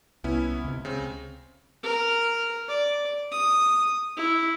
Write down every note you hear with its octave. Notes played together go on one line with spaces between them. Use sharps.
C2 B3 C#4 E4
C#2 C3
C#3 C4
A#4
D5
D#6
E4